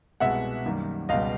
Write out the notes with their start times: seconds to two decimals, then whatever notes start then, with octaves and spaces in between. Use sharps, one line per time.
0.20 C2 B2 G#3 E5 F#5
0.65 F#2 D#3 G3 A#3
1.09 C#2 B2 G3 D#5 F5